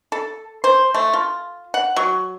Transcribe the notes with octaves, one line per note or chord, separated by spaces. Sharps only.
A4
C5
A3
F4
F#5
F#3